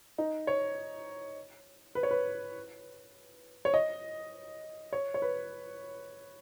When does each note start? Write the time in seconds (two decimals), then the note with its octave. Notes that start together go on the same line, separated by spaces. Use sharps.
0.18 D#4
0.47 C#5
1.95 B4
2.03 C#5
2.11 B4
3.65 C#5
3.74 D#5
4.93 C#5
5.14 C#5
5.22 B4